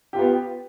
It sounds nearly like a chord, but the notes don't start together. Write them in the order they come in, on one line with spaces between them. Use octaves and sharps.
G4 F4 B3